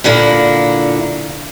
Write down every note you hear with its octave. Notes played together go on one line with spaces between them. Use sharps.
A#2 D3 A#3 E4